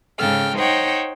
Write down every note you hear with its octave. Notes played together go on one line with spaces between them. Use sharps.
G#2 C#3 A4 G5 F6
D#4 C5 C#5 F#5 G5